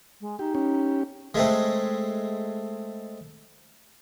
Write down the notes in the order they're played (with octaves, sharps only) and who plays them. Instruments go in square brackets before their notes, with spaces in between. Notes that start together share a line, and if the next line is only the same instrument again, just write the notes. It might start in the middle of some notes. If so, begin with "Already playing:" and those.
[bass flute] G#3
[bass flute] D#4 [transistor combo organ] G4
[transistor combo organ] C#4 G4
[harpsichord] G#3 A3 C4